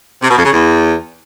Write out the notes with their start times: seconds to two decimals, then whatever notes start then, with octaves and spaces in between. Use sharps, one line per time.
0.23 C3
0.30 B2
0.38 F2
0.45 C#3
0.53 E2